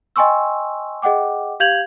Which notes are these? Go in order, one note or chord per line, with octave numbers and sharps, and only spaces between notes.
D#5 G5 G#5 C6 C#6 E6
G#4 D#5 F#5 G5 D6
G4 F5 G6 G#6 F7 F#7